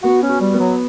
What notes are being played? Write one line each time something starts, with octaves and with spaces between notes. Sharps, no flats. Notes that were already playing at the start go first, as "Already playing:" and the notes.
B3 F#4
C#4
F#4
G3
B3
F#3